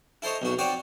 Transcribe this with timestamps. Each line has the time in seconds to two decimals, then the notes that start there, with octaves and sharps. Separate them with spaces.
0.22 E4 A4 C5 C#5 D#5
0.42 B1 E2 F#4
0.59 C4 F#4 C#5 D5 G5